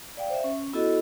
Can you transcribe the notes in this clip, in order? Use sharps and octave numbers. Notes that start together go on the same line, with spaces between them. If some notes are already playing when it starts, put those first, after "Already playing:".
D5 F5 G5
C5 E5
C#4
B3 E4 F#4 A4 D#5